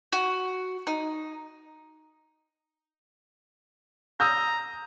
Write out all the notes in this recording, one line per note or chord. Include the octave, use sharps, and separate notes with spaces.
F#4
D#4
A#5 D#6 E6 G6